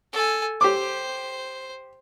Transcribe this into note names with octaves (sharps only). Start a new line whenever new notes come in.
A4 G#5
G4 C5 D6